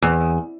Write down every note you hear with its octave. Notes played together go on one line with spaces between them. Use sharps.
E2